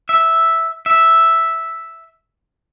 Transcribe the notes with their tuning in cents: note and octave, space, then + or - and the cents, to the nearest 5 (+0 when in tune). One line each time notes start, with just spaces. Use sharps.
E5 -5
E5 -5